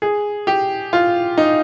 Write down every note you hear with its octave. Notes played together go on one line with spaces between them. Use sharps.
G#4
G4
F4
D#4